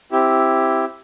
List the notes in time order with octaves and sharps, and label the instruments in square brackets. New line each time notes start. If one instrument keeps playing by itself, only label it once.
[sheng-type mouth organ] C4 E4 G4